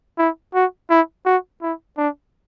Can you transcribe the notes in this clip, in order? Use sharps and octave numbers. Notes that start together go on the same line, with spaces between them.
E4
F#4
E4
F#4
E4
D4